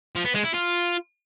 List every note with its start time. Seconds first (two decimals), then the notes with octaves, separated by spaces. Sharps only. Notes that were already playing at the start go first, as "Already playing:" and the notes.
0.15 F3
0.25 B3
0.35 G#3
0.44 E4
0.54 F4